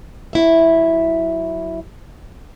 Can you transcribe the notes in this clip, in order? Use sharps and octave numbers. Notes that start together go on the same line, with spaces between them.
F#3 E4 E5